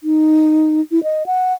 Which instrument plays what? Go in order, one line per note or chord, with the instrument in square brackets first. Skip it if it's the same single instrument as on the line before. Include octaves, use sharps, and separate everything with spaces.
[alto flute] D#4
E4
D#5
F#5